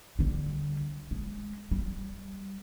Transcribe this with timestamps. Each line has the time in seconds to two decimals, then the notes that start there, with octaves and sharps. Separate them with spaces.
0.19 D3 G3
1.11 G#3
1.71 G3